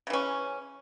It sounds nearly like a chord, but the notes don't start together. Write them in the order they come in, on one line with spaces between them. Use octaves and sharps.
C#3 E3 C#4